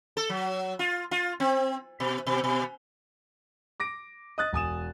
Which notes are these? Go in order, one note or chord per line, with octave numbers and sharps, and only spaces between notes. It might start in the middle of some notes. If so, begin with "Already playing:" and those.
A4
F#3
F4
F4
C4
B2
B2
B2
D6 A#6 D7
D#5 D#6 F#6 A6
E1 G#5 D#6 E7